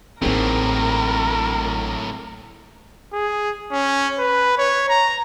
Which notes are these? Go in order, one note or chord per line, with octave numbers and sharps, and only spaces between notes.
A1 A2 F#3 A#3 C4 D#4 G#4 A#4
G#4
C#4
B4
C#5
A#5